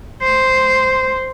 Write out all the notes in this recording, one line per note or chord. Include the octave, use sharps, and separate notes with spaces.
C5